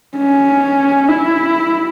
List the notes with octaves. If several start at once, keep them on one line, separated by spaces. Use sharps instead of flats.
C#4
E4